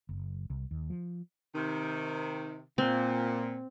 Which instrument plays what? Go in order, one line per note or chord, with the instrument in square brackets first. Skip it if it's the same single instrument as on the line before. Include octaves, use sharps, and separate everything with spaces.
[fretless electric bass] F#1
C2
D#2
F3
[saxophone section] C3 D#3
[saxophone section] A#2 [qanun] C4